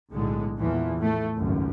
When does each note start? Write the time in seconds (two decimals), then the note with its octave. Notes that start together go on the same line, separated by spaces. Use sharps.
0.11 B1 A2 D3 G#3
0.58 E2 A#2 E3 F3
0.98 A2 A3
1.37 G#1 C#2 F#2